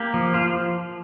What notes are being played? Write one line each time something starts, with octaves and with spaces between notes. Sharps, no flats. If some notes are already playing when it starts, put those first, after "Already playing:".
Already playing: A#3 G4
F3
F3 F4